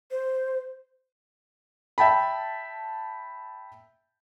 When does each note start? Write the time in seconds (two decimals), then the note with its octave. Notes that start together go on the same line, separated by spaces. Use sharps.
0.11 C5
1.98 E5 G5 A5 B5